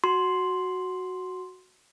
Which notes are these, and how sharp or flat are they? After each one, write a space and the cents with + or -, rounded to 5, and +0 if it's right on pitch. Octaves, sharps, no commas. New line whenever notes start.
F#4 +0 C6 +0